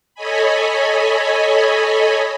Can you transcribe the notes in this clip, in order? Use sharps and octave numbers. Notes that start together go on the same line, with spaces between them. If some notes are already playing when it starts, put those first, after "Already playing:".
A4 C#5 D#5 G#5 B5